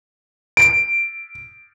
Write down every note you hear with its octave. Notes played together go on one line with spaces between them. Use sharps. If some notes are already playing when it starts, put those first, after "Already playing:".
D7